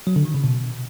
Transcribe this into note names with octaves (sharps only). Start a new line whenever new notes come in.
F#3
D3
D#3
C#3
B2